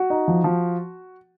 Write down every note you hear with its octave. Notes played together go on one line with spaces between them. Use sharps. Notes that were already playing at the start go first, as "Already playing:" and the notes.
Already playing: F#4
D#4
F3
F3